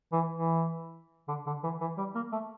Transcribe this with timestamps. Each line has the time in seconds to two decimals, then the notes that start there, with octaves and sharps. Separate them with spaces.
0.12 E3
0.35 E3
1.28 D3
1.47 D3
1.64 E3
1.81 E3
1.98 G3
2.15 A#3
2.32 A3